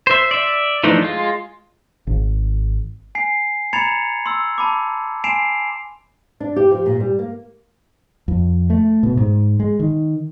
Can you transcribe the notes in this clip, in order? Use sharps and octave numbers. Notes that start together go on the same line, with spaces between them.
C5 E5
D5 E5
E3 F3 A3 D4 D#4
G#3 F4
G#1
G#5 C7
A#5 B5 G#6 A6 C#7 F7
C6 E6
A5 B5 D6
G#5 C6 C7 D7 E7 F7
D4
G4
F3
A#2
G3
A#3
F2
A3
B2
G#2
G#3
D#3